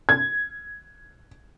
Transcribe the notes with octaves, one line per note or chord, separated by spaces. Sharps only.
G#6